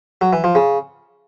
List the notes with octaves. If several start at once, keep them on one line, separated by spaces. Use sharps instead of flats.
F#3
E3
F3
C#3